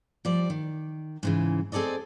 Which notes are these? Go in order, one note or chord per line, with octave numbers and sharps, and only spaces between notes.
F3 G3 D5
D#3
G#2 C#3 E3
C4 G#4 A4 D5 D#5